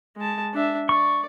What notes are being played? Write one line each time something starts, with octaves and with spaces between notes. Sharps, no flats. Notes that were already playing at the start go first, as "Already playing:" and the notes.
G#3 A5
D4 E5
D5 C#6